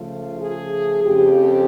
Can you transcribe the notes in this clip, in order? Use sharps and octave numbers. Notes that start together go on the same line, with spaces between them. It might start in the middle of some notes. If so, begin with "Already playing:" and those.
Already playing: C#3 F3 A3 F4
G#4
F2 C#3 F3 G4